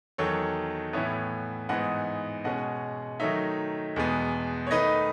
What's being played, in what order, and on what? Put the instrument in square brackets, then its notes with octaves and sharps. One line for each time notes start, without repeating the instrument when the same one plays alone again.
[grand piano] E2 D#3 F#3 A4 C#5
A2 E3 B3 C#5 E5
G#2 E3 B3 D#4 D#5 F#5
B2 G#3 C#4 D#5 F#5
D#3 F#3 A3 D#4 C#5 E5
E2 B2 G#3 B3
C#5
D#3 A3 D#4 B4 D#5